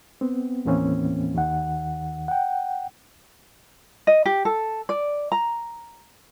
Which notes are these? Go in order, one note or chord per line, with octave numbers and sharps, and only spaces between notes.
B3 C4
D#2 A2 E3 A#3 C4 C#4
D#2 D#3 F#5
F#5 G5
D#5
G4
A4
D5
A#5